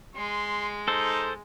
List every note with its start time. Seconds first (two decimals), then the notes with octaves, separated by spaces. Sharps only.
0.16 G#3 C6
0.88 D#4 A4 C5